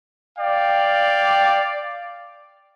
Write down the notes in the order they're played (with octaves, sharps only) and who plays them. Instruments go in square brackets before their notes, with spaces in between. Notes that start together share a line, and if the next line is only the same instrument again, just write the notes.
[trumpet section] D5 F5 G5